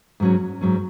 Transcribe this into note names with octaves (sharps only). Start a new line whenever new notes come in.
G#2 F#3 C#4
G#2 F#3 C#4